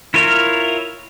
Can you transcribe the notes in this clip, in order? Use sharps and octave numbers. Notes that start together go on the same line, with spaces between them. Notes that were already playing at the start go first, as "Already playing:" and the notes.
E4 F4 A#4 C#5